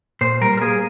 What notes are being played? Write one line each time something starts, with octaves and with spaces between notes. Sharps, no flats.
A#2 C5
G3 A#4
A#4
A#3 G#4